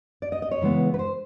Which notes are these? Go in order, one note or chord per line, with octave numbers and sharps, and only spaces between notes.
D5
D#5
D#5
C#5
C#3 E3 G#3 B3
B4
C5